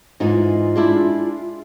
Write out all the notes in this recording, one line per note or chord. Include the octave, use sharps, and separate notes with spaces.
G#2 E3 D#4 F4
G#3 D4 E4